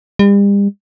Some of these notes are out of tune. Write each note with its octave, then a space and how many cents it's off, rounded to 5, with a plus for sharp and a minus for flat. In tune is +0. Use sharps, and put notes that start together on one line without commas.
G3 +40